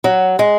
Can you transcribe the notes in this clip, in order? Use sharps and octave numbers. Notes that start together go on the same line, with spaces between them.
F#3
G#3